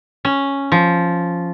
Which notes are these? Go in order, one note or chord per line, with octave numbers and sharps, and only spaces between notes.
C#4
F3